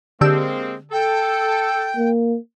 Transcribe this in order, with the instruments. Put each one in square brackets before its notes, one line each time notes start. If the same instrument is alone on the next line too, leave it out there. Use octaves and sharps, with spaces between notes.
[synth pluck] D3 G4 E6 [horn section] G#3 A#3 C4
[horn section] A4 [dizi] G5
[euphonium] A#3